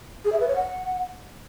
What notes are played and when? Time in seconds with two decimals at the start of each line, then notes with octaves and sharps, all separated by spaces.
0.25 G#4
0.32 E5
0.40 B4
0.48 C#5
0.56 F#5